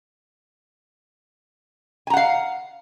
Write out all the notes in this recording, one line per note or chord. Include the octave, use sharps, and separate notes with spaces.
F5 F#5 G#5 A#5